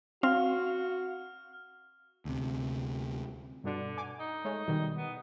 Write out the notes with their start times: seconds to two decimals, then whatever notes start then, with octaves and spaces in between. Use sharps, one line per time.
0.23 C4 F#4 F5 F6
2.25 D2 C3
3.64 G2 B2 D3 D4
3.97 G#5 D6
4.20 D#4
4.45 G#3 A3 C#5
4.68 B2 D#3 G3
4.96 B3